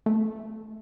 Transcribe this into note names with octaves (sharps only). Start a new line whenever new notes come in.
A3